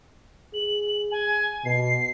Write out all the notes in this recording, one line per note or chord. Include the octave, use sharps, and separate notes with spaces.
G#4 F#7
G#5
B2 C7